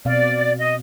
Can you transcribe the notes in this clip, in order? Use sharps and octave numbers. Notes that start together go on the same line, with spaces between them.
B2 C4 D5 F5
D#5